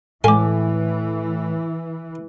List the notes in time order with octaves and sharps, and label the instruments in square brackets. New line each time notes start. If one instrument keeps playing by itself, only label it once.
[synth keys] A2 [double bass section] E3 [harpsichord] G#3 A3 F5 [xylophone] G#5 D6